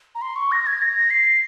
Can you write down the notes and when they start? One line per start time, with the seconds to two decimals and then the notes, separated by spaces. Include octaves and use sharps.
0.15 A#5
0.22 C6
0.36 C#6
0.52 A#6
0.66 G#6
0.82 A#6
1.10 C7